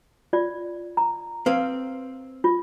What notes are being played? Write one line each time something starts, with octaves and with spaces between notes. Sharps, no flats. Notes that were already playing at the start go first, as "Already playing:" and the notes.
F4 D5
A#5
C4 B4 F5
F4